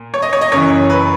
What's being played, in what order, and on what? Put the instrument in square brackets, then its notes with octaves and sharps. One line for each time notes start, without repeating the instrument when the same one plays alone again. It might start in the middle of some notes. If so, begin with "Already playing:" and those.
Already playing: [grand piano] A#2
C#5
D#5
C#5
D#5
F#1 F#2 E3 C#5
B4